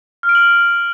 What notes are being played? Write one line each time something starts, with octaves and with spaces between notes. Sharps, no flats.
F6
D7
F#7